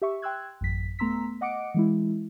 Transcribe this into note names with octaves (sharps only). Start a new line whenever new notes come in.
G4 E5 C#6
G5 C6 E6 F#6 G#6
A1 F#2 B6
A3 B3 A#5 C6 E6 B6
D#5 F#5 D6 C#7 D7
E3 G#3 E4